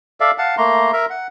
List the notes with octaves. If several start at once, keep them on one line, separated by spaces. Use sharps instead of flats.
A4 D5 E5 F5
F5 F#5 A5
A3 A#3 A#5 C6
A#4 E5 A#5
F#5